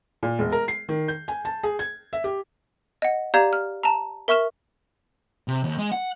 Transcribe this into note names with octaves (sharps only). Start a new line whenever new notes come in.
A#2
E1
A#4
C7
D#3
G6
G#5
A5
G#4
G#6
E5
G4
D#5 F#5
G4 D5 F5 A#5 G6 G#6
F6
A5 A#5
A#4 E5 C#6 F6 E7
C3
D#2
G#3
F#5